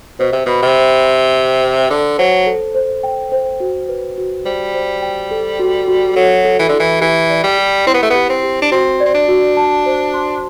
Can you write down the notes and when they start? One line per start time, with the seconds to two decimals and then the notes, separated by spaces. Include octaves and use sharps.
0.19 B2 C5
0.32 C3
0.46 B2 B5
0.63 C3
0.77 C5
1.05 G5
1.33 G5
1.62 C5
1.90 D3 A5
2.18 F#3 C5
2.46 A4
2.75 C5
3.03 G5
3.32 C5
3.60 F#4
3.89 B4
4.18 F#4
4.45 G3 C5
4.74 C5
5.02 G5
5.31 A4
5.59 F#4
5.87 F#4
6.16 F#3 A4
6.45 A4
6.59 E3
6.69 D3 E4
6.79 E3
7.01 E3 G4
7.30 D5
7.44 G3
7.58 G4
7.86 C4 E4
7.94 B3
8.02 A3
8.10 B3 G4
8.29 C4
8.43 G4
8.62 D4
8.72 C4 F#4
9.00 C4 D5
9.14 D4
9.28 F#4
9.57 A5
9.86 C5
10.14 C6